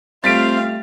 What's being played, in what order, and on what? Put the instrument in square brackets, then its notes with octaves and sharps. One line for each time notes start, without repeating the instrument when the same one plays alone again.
[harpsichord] G3 A3 [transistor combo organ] C4 [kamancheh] F4 F5 [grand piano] A6 B6 D7